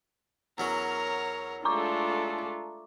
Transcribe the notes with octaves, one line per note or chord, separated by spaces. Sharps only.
E2 F#3 C#4 A#4 C#5
G#3 A3 D4 F4 A4 A#5 C#6 D6